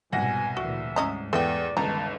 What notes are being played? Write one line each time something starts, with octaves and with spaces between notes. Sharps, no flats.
C2 G#2 B2 F#5 G#5 A#6
D2 A#2 E3 F#4 E5
G#2 C#4 D#5 A#5
E2 A3 B3 D5 G5
G1 C#2 D#3 E3 A5 A#5